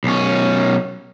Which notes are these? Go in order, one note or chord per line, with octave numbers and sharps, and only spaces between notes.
B1 C#4